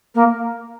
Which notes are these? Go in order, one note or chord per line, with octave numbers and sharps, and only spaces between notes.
A#3